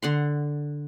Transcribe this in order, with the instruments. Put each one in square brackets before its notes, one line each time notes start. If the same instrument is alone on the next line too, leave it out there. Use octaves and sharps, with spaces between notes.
[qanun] D3 F#5 C6